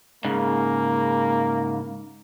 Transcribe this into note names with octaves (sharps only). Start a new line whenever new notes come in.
G#2 C#3 A#3